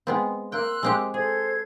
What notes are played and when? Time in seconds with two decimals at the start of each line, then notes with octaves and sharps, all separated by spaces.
0.07 G#3 B3 C4
0.52 A#3 G5 C6 E6 F#6
0.83 G#3 C4 G4
1.14 G#4 A4 C5 G#6